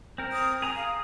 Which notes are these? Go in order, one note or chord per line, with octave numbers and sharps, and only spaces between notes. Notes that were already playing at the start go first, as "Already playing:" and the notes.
C4 A#4
D#6
G#4 G#5 A#5 D#6
F5